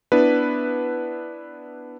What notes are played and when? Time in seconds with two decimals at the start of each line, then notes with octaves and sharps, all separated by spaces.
0.12 B3 D4 E4 B4